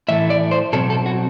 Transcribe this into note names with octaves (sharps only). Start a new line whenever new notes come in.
A2 E3 A3 E5
D5
C5
B2 F#3 C4 A4
A4
F#4